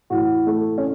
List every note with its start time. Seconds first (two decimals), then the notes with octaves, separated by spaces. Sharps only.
0.10 A2 E3 F#4
0.47 A3
0.78 C#4